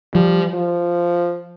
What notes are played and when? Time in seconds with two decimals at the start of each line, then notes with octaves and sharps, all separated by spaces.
0.14 F3 G3
0.54 F3